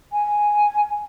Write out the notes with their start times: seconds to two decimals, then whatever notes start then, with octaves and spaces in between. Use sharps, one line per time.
0.13 G#5